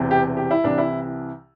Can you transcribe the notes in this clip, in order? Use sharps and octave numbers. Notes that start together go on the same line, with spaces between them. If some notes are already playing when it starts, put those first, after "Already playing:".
Already playing: E1 E2 C3 E3
G4
G4
E4
C2 C3 E3 D4
E4